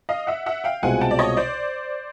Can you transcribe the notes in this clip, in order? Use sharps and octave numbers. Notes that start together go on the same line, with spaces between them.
D#5 F5
E5 F#5
E5 F#5
F5 G5
C2 B2 G#3 C4 F4 F#5 G#5
G5 A5
D5
C#5 D#5
C5 D5